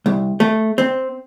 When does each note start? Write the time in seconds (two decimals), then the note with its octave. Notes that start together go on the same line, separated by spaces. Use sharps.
0.06 C2
0.40 A3
0.78 C4